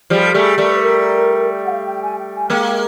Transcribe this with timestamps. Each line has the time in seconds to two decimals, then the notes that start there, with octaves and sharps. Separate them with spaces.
0.10 F3 G3 G#4
0.22 A4
0.32 G3 A3 G#4
0.58 G3 A3 A#4
0.69 B4
0.80 A#4
1.65 F#5
1.70 F5
1.86 G5
2.02 G#5
2.18 G5
2.34 G#5
2.50 G#3 A#3 G5
2.66 G5